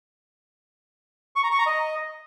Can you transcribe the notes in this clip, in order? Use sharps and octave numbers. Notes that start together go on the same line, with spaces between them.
C#6
A#5
C#6
A#5
D#5